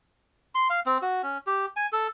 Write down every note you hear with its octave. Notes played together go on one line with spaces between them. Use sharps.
C6
F5
C4
F#4
C#4
G4
G#5
A4